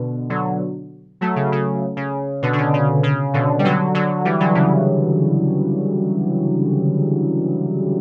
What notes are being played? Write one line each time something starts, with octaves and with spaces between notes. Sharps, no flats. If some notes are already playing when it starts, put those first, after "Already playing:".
Already playing: B2 D3
D3 F#3
F#3 A3
C#3
C#3
C#3
B2 D3
D3
C#3
C#3
C#3
B2 D3
G3
D3 F#3
D3 F#3
E3 G3
D3 F#3
C#3 E3